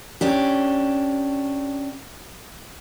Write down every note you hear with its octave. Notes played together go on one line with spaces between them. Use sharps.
C#4 D4 G4